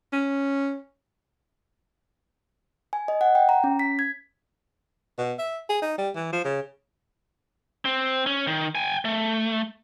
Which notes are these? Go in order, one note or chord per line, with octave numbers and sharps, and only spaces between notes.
C#4
G#5
D#5
F#5
G5
A#5
C#4
B6
G#6
B2
E5
G#4
D#4
G3
E3
F3
C#3
C4
C#4
D#3
G5 G#5
A3